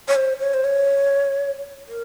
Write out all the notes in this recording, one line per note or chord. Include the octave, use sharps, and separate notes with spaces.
C#5
C5
C#5
C5
C#5
A#4